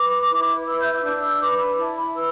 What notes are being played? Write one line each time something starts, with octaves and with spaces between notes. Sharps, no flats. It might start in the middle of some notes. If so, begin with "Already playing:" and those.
Already playing: B4 D6
E4
B4 E6
G6
E6
D4 G6
E6
B4 D6
B5
E4 A5
B5
B4 E6